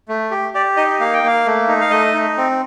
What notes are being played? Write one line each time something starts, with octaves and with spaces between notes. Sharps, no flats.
A3
G4
G4 D5
D#4 D#5
A#3 F5
G5
A#3 F5
A3
D#4
F5
A3 D#5
D#4
C4